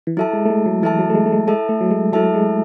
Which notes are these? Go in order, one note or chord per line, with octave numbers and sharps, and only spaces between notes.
E3
F#3 E4 A4 E5 A5
G#3
A3
G#3
F#3
E3 E4 A4 E5 A5
F#3
A3
G#3
A3
G#3
G#3 E4 A4 E5 A5
A3
F#3
G#3
F#3 E4 A4 E5 A5
G#3